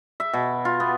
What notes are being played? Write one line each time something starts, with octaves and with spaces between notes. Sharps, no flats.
E5
B2
F4
B3